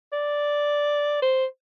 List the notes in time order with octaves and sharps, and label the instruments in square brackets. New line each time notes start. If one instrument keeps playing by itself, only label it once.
[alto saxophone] D5
C5